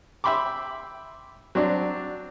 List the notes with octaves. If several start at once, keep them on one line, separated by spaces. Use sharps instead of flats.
E5 G5 B5 C6 D6
F#3 C4 D4